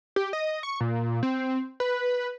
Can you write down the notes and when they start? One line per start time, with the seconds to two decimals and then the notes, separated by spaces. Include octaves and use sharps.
0.16 G4
0.33 D#5
0.63 C#6
0.80 A#2
1.23 C4
1.80 B4